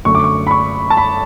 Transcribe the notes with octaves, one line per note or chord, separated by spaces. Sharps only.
F#2 D3 A3 C#6
D6
C#6
B5
C#6
A5
B5